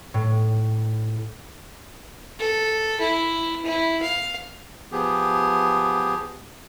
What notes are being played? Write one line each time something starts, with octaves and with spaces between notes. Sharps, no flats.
A2
A4
E4
E4
F5
F3 B3 G4 G#4